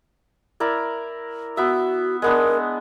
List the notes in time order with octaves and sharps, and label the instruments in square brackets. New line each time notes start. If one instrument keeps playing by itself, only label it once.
[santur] E4 A#4 D5
[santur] B3 E5 [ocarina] F#4
[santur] G#3 B3 D4 [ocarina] A#4